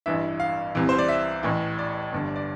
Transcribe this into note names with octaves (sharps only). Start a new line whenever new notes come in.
A1 G2 E3 E5
F5
C2 C3 E3
C5
D5
E5
A1 A2 E3
D5
G1 G2 D3
D5